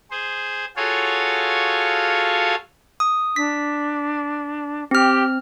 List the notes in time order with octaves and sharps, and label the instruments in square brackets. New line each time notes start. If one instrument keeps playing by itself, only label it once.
[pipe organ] G#4 C5
F4 F#4 G#4 A4 C#5 F5
[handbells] D#6
[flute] D4 [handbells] B6
[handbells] C4 F6 [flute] G4